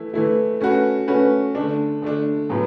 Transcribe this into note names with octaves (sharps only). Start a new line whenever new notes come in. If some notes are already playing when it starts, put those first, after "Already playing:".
Already playing: E3 A3 E4
E3 A3 E4
A3 C#4 F#4 B4
A3 C#4 F#4 B4
D3 A3 D4
D3 A3 D4
A2 F#3 B3